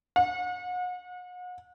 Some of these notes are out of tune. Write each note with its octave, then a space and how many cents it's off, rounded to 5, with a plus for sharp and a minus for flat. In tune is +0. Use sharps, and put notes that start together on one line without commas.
F#5 -40